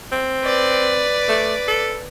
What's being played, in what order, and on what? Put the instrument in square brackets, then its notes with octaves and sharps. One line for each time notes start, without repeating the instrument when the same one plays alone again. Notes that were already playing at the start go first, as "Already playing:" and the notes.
[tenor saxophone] C4
[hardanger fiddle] B4 D5
[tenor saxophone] A3
A4